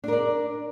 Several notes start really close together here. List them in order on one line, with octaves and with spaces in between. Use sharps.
D4 A#4 D5